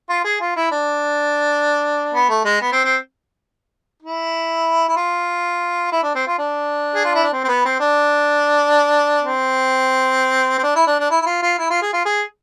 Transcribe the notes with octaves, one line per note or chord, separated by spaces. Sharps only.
F4
G#4
F4
E4
D4
B3
A3
G#3
B3
C4
C4
E4
E4
F4
E4
D4
C4
F4
D4
G#4
F4
E4
D4
C4
C4
B3
C4
D4
C4
C4
D4
E4
D4
D4
E4
E4
F4
F4
E4
F4
G#4
F4
G#4